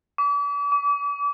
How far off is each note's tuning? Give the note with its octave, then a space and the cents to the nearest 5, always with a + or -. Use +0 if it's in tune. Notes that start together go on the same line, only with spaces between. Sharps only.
D6 -40
D6 -30